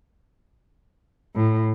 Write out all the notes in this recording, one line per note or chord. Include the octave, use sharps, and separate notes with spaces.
A2